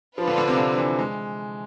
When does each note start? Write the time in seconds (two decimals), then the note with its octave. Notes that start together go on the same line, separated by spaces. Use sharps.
0.18 F3 D4 F4 B4
0.28 D3
0.38 D3
0.48 C3
0.58 D3
0.78 E3
0.99 G#3